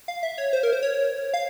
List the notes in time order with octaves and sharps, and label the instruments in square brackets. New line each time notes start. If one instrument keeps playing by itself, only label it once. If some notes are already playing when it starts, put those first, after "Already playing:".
[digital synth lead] F5
E5
C#5
C5
A#4
C5
C#5
F5